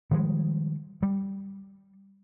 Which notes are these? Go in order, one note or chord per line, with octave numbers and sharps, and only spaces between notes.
D#3 F3 G3 G#3
G3